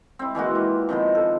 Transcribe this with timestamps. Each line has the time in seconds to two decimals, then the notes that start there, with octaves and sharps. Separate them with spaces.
0.19 C4 E4
0.35 E3 G#3 A#3 F#4
0.55 F4
0.89 C3 D#3 F3 B3
1.15 A4